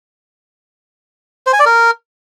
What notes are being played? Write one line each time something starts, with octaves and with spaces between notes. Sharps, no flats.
C5
G#5
D5
A#4